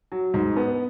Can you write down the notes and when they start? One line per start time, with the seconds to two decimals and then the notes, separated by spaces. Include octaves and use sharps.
0.12 F#3
0.34 G#2
0.57 B3